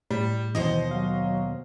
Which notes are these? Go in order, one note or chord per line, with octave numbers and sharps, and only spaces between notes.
A2 G3
D#2 B2 E3 C5 D#5
F#3 F5